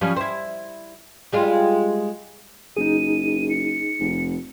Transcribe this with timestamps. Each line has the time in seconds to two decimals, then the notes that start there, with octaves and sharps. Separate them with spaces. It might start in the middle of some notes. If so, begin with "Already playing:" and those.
0.01 F3 G3 C#4
0.16 E4 C5
1.32 G3 G#3 F4
2.77 F#1 D#4 G#4 D#7
3.50 C#7
4.00 F1